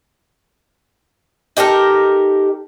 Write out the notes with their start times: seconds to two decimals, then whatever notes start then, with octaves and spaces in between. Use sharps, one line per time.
1.57 D#4 G4 A4 A#4